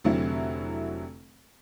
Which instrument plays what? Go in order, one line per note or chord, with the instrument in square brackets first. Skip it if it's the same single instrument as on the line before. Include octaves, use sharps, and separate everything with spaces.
[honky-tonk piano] F1 D3 F#3 C4 E4